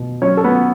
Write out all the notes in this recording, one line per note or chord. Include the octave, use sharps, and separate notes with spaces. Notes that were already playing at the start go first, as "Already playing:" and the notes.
Already playing: B2
F#3 C#4 C#5
A4
B3 B4
A3